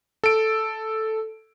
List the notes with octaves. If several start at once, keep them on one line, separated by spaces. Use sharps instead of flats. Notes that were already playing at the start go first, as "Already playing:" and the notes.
A4 D7